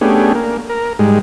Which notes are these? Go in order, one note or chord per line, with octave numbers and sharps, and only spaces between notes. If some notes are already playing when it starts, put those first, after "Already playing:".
A3 B3 C#4 D4 G4 G#4
A#3
A#4
G#2 G3 G#3